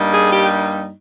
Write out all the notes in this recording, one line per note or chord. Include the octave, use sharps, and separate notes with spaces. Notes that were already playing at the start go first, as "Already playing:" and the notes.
Already playing: G2 G3 A#3 D#4
G#4
G4